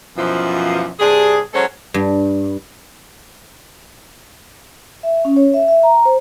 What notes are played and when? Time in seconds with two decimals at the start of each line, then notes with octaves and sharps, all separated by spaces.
0.17 F#2 B2 E3 F3
1.00 G2 C3 D4 G#4
1.54 F#3 G#3 C#4 A4 C5 C#5
1.94 G2
5.03 E5
5.25 C#4
5.36 C#5
5.54 E5
5.68 E5
5.83 A#5
6.05 C5